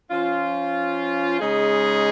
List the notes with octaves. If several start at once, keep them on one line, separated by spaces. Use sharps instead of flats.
F3 C#4 F4
C#3 G#3 D#4 G#4